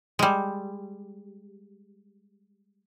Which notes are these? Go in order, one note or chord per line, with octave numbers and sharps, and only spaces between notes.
G3 G#3